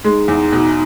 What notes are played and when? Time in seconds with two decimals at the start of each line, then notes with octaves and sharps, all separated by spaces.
0.04 G#3 D#4
0.28 E2
0.52 B2